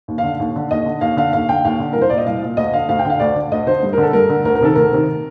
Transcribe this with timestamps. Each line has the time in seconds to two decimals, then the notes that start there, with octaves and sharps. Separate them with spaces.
0.08 D#2
0.18 F5
0.23 D3
0.40 D#2
0.56 D3
0.71 D#2 D#5
0.86 D3
1.01 D#2 F5
1.17 D3 F5
1.33 D#2 F5
1.49 D3 G5
1.65 D#2 F5
1.80 D3
1.93 C2 A#4
2.01 C5
2.10 A#2 D5
2.18 D#5
2.26 C2 F5
2.43 A#2
2.57 D2 D#5
2.74 D3 F5
2.89 D2 F5
2.99 G5
3.05 D3 F5
3.20 D2 D5
3.35 D3
3.52 D2 D#5
3.67 D3 C5
3.83 G2
3.93 D3 A#4
4.03 A4
4.13 G2 A#4
4.29 D3
4.44 D2 A#4
4.55 A#4
4.61 C3 D#3 A4
4.75 D2 A#4
4.92 C3 D#3